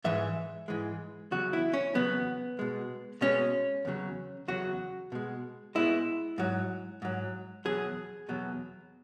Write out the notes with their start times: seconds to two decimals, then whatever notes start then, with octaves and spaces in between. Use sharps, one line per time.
0.04 G#2 E3 G#3 E5
0.68 G#2 E3 G#3
1.31 E2 C#3 F#3 F#4
1.53 E4
1.73 C#4
1.95 E2 C#3 F#3 B3
2.59 B2 G#3
3.21 B2 G#3 C#4
3.85 E2 C#3 F#3
4.48 E2 C#3 F#3 F#4
5.12 B2 G#3
5.75 B2 G#3 E4
6.38 G#2 F#3
7.02 G#2 F#3
7.65 E2 B2 F#3 G#4
8.29 E2 B2 F#3